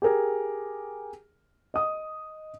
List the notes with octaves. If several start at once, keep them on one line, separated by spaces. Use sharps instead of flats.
G4 G#4 A#4
D#5 D#6